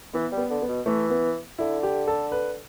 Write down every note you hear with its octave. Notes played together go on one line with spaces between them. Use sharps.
E3 B3
G3
B3
D3
B3
B2
E3 A3
B3
D3 E4
G4
A4
B4